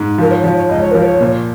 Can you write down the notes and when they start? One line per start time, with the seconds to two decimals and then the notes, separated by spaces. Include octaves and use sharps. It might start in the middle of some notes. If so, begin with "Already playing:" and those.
Already playing: G#2
0.18 F3 A#4
0.31 C#5
0.43 F3 C#5
0.56 C#5
0.69 C#2 D#5
0.81 C#5
0.91 F3 A#4
1.03 C#5
1.20 A#2